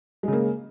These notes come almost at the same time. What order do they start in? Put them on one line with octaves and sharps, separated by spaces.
G#3 C#3 A#3